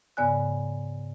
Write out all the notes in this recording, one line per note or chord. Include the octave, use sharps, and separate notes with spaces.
G#2 C#3 B3 D5 G#5 F#6